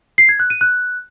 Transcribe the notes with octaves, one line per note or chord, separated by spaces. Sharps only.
C7
G#6
F#6
D#7
F#6